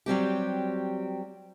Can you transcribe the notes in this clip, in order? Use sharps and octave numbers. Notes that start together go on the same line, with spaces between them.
F#3 G3 C4 G4